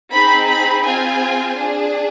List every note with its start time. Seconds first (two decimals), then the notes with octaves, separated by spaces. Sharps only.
0.14 C4 D#4 G#4 B5
0.49 B5
0.85 C4 F4 G#4 G#5
1.57 D4 G#4